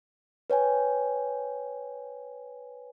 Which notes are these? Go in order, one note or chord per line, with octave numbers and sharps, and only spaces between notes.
B4 C#5 G5 G#5